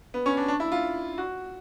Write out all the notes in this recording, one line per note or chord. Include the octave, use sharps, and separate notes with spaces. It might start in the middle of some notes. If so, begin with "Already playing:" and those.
B3
C#4
D4
D4
E4
F4
F#4